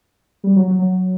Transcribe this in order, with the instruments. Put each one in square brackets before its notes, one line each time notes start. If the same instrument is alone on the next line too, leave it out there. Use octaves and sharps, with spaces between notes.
[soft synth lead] G3
F#3
F#3
F#3